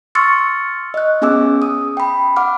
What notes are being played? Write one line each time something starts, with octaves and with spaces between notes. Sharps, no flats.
C6 C#6 E6 F6 A6 C#7
D#5 F#6
B3 C#4 G#4 G#5 D6 E6
D#6
G5 B5
F#5 D6 F6